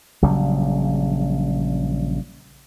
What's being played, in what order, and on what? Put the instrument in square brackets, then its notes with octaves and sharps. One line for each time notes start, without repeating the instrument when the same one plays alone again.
[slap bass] A#1 C#3 F#3 G3